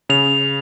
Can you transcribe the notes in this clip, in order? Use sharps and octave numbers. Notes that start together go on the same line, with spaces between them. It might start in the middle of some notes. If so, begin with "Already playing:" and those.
C#3 F7